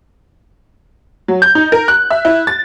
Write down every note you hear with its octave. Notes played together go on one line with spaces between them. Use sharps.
F#3
G6
D#4
A#4
F#6
E5
E4
A6